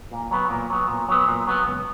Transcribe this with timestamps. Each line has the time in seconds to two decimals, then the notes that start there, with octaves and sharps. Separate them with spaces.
0.11 A#2
0.31 F#3 B3
0.50 A#2
0.70 F#3 B3
0.88 A#2
1.09 F#3 B3
1.28 A#2
1.47 F#3 B3
1.66 C#2